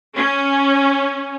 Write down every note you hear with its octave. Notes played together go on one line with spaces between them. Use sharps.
C#4